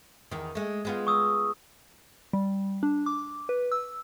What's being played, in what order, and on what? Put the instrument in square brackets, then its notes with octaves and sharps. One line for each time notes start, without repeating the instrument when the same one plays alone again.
[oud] E2 D#3
G#3 A3
G#3 B3 F4
[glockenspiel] C#6 D#6 E6
[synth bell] G3
D4
D6
B4
E6